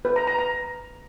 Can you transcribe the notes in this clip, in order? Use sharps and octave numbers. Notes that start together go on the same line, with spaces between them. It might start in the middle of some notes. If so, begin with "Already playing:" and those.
B4
A#5
A#5
A#5